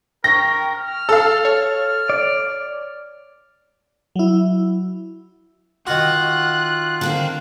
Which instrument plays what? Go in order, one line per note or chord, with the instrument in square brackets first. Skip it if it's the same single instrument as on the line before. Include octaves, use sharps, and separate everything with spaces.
[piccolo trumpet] A#4 [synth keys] G5 C#6 [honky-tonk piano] A#6
[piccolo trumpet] F6
[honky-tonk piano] A4 F5 [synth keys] E6
[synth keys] C#5
[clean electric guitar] D5
[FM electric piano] F#3 E4
[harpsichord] D#3 F#4 [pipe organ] F4 [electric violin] F#6
[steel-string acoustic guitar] D3 A#3 C4